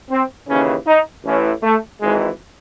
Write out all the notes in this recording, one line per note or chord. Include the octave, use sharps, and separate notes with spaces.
C4
D#2 C#3 E3 C#4
D#4
A1 A2 E3 C#4
A3
G#1 G#2 E3 G#3